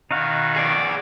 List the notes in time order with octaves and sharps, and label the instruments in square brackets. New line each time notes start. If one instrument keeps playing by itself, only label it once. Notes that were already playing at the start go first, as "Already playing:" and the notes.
[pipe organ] B2 D#3 [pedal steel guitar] D#4 F#4 F5
[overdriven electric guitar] G#4 D5